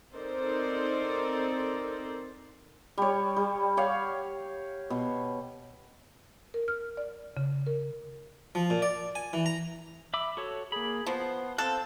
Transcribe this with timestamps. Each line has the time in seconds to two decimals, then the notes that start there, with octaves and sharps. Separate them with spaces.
0.13 C4 D#4 A4 A#4 C5 D5
2.98 G3 C#5
3.36 G3
3.77 G4 C#5 F5 F#5
4.90 B2
6.54 A#4
6.68 F6
6.97 D5
7.37 C#3
7.67 A#4
8.55 F3
8.70 A#2
8.82 D5
9.15 G#5
9.33 E3
9.46 A#5
10.14 E5 B5 D6
10.37 F#4 A4 C#5
10.72 A#3 G#4 B5
11.06 F3 B3 C5
11.58 C4 A4 F5 F#6